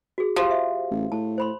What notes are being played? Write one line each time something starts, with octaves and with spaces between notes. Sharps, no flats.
F#4 G#4
F3 G4 C5 F5
E5
A1
A2 A5
C5 B5 C6